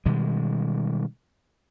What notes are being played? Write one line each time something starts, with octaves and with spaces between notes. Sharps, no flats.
B2 D#3 G3 G#3